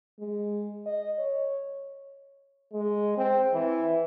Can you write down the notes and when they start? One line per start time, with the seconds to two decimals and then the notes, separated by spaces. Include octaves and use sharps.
0.20 G#3
0.86 D#5
1.19 C#5
2.73 G#3
3.17 C4
3.54 E3